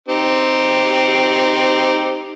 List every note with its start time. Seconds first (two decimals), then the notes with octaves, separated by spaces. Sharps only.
0.08 C4 D#4 G4